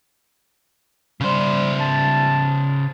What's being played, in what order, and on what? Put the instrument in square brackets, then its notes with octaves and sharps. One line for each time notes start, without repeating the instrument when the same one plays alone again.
[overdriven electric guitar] C#3 C5 [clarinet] G3
[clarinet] A5